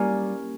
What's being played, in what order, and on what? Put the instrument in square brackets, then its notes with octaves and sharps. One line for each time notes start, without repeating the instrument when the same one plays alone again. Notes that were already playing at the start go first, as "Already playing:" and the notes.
Already playing: [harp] G3 A#3 C#4 E4 G4